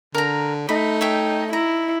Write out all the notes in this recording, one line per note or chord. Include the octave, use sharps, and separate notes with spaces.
D3 A#4 A#5
A3 D#4 B5
C#5 E5 G5
E4 A#5